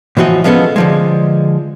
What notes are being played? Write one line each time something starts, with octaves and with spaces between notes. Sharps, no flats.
A2 E3 F3 F#4 D#5
F3 G#3 B3 C#4 A4
D3 F3 G#3